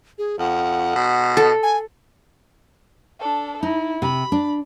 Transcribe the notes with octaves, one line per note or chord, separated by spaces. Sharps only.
G#4
F2 F#5
B2
A4
G#5
D4 A4
D#4 E4
C3 B5
D4